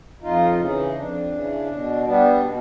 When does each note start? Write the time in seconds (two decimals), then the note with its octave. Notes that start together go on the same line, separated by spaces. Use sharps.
0.22 F2 D#4 F4
0.58 C#3 E3 D#4
0.95 F2 D4
1.31 C#3 E3
1.69 B2
2.04 G3 B3 D4
2.41 B2